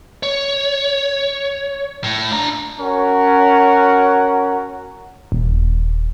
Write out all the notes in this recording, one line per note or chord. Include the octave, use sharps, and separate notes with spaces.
C#5
A2
D4 A#5
C#4 F#4 A#4 C#5 F#5
D#1